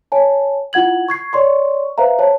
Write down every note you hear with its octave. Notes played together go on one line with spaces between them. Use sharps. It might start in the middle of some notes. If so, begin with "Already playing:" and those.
C#5 G#5 A5
E4 F4 F#5 G#6 F#7
C#6 G#6 C7
C#5 D5 C6 C#6
B4 C5 E5 F5 A#5
C5 C#5 A5